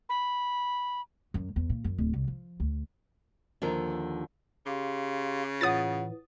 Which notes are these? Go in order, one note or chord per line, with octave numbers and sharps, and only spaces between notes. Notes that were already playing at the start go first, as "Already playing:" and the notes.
B5
F#2
E2
A#2
F#2
D1
C2
F3
D2
D#2 D3 F3 A#4
C#3 G4 F5 C6
A2 E3 F4 C#5 F#5 D#6 A6